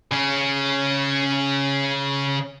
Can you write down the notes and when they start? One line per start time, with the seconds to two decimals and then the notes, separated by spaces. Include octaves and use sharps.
0.11 C#3 C#4